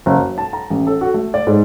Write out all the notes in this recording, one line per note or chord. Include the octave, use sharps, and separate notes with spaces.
F#1
F#3
A5
A#5
A1
A4
F#4
A3
D5
G#2